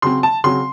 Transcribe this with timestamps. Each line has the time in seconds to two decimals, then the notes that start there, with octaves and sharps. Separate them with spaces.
0.02 C#3 F#3 C4 C6
0.23 A5
0.44 C#3 F#3 C4 C6